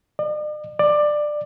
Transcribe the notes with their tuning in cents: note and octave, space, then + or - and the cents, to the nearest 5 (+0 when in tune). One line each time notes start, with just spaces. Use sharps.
D5 +45
D5 +15